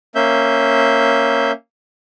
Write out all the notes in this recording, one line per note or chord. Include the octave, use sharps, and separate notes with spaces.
A#3 C#4 E5 G6